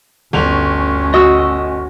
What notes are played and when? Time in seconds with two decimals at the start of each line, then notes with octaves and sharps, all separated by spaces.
0.33 G1 D2 C#4 F7
1.14 F#4 D#5 D#6 E6